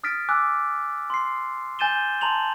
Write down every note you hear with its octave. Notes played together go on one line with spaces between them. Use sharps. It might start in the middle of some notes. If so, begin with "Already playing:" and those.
D#6 F6 A6 B6 D7
G#5 D6 E6 F#6
C6 C7
G#5 G6 A6 D#7 E7 G7
A5 A#5 C6 F7 F#7